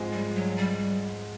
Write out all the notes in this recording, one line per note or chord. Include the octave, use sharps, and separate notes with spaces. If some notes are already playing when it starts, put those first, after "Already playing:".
Already playing: G#2 F3 G#3 C4 F4
G3
F#3
G3